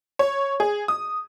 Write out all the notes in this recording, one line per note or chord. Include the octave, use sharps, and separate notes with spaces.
C#5
G#4
D#6